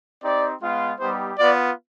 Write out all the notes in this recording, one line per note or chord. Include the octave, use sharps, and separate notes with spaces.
C4 D#4 G4 D5
G#3 B3 F4
G3 B3 D#4 G4 C5
B3 F4 D5